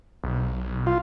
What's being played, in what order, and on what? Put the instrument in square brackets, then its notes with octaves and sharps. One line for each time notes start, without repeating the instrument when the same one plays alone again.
[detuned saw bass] B1
[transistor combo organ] F4